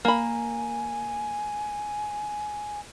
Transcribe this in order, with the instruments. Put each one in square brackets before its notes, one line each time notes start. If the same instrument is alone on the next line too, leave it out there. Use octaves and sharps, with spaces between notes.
[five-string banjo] A#3 B5 [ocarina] G#5